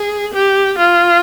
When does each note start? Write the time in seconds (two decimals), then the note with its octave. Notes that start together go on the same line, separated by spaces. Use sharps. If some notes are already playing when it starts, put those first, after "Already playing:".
Already playing: G#4
0.34 G4
0.79 F4